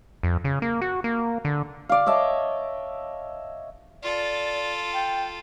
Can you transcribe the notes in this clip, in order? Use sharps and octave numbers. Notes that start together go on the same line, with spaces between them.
F2
C#3
A#3
F#4
A#3
D3
D5 F5
C#5 D#5 E5 A5
F4 A4 D5
G5